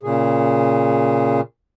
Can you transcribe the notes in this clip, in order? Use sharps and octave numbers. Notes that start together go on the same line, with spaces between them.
A#2 C#3 G#4